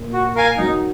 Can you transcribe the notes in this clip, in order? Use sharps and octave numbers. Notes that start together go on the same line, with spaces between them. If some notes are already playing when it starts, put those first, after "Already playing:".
Already playing: A#2
F#4
A#4 F5 G#5
D#3 F#3 D#4